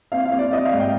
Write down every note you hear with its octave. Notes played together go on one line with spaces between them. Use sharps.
C4 F5
F5
C4
D5
C4 D#5
F5
G#2
G5